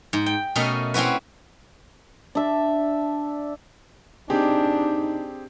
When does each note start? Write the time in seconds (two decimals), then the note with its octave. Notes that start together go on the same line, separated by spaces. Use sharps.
0.13 G#2
0.26 G5
0.56 B2 A3 C#4 A#4 D#5 E5
0.94 C4 C#4 E4 F#4 B4
2.35 D4 E5
4.30 C4 D4 D#4 G4 G#4